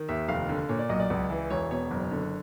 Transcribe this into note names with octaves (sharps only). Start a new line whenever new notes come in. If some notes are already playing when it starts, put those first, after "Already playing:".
Already playing: D#3
D#2 E5
F1 F5
D3
A#2 C#5
D5
B1 D#5
D5
C#2
E3
E1 C#5
B2 C#5
F#1
D3